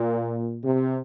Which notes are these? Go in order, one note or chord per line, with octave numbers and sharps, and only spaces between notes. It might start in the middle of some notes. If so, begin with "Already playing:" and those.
Already playing: A#2
C3